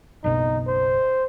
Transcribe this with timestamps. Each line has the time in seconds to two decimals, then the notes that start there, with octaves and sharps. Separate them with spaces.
0.24 F#1 B1 B2 D#4
0.67 C5